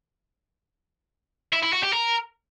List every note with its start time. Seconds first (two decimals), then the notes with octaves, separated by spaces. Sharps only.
1.53 E4
1.63 E4
1.73 F#4
1.83 G4
1.93 A#4